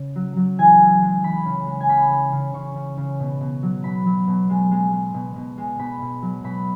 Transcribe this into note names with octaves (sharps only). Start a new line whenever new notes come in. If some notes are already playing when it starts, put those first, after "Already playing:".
Already playing: C#3
F#3
F#3
E3 G#5
G#3
G#3
E3 B5
C#3
G#3
G#5
C#3 B5
G#3
C#3
C#3 C#6
C#3
C#3
B2
B2
F#3
B2 B5
F#3
B2
G#3
G#3
G#3
B2
B2
G#3
B2 B5
B2
F#3
B2 B5